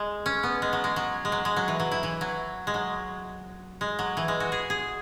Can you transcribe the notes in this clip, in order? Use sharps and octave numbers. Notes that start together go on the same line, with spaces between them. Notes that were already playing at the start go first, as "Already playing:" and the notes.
Already playing: G#3
C#4
B3
G#3
F#3
G#3
F#3
G#3
F#3
G#3
F#3
E3
F#3
E4
E3
F#3
G#3
F#3
G#3
F#3
E3
G#3
F#4
G#4
G#4